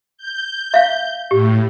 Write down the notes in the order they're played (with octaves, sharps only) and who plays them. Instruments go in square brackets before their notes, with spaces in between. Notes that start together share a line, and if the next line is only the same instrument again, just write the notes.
[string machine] G6
[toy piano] E5 F5
[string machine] A2 [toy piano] G4